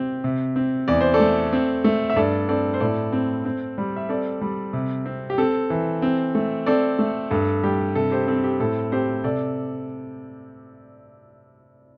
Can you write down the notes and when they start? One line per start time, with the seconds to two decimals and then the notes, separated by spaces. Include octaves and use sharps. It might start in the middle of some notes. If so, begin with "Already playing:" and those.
Already playing: C3 C4 G4
0.24 C3
0.56 C4
0.88 E2 D5
1.01 C5
1.14 A4 D5
1.20 A3
1.53 C4
1.84 A3
2.10 E5
2.16 G2 A4 D5
2.49 C4 A4 D5
2.74 C5
2.80 A2 A4 D5
3.13 C4
3.45 C4
3.78 G3
3.96 E5
4.09 C4 A4 D5
4.41 G3
4.73 C3
5.06 C4
5.30 G4
5.38 C4 A4
5.70 E3
6.02 C4
6.35 A3
6.66 C4 A4 D5
6.99 A3
7.31 G2 A4
7.63 G3 G4
7.95 C3 A4
8.11 G4 C5
8.28 C4 A4
8.44 G4
8.60 A2 A4
8.92 C4 G4 C5
9.24 C3 A4 D5